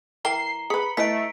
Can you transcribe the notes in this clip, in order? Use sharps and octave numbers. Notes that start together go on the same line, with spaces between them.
E3 A#4 G5 A#5 C7 G7
G#4 B4 B5 C#7
A3 E4 B4 D#5 B6 D7